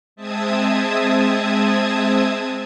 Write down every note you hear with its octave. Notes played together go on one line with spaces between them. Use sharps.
G#3 C4 E5 A5 D#6 G#6